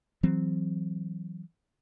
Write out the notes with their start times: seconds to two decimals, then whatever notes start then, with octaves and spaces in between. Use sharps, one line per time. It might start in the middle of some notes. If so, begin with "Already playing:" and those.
0.23 E3 F#3 C4